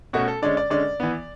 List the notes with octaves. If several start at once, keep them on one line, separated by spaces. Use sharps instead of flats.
B2 A3 C#4 F#4
A4
D3 G#3 C#4 D5
D5
D3 G#3 C#4 D5
E3 B3